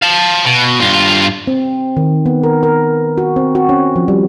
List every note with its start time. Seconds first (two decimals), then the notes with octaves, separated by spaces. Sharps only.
0.02 F5 A5
0.45 B2
0.81 G2 F4
1.47 C4
1.97 D#3
2.26 B3
2.43 A#4
2.63 A#4
3.18 F#4
3.36 C4
3.55 F#4
3.69 C#4
3.96 F3
4.08 G3